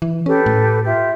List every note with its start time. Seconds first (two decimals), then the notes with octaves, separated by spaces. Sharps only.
0.02 E3
0.26 C#4 G4 A4 B4
0.46 A2
0.85 F4 G4 E5